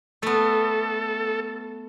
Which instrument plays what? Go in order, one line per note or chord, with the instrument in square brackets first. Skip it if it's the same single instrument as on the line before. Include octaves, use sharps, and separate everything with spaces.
[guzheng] A3 B3 [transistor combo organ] A4